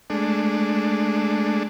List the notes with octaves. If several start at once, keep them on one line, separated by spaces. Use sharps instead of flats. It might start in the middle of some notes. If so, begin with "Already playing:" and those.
G#3 A3 D4